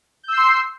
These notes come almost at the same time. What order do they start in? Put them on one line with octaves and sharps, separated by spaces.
G6 E6 C7 C6